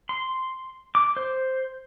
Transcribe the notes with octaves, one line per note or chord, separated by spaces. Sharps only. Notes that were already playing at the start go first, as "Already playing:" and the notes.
C6
D6
C5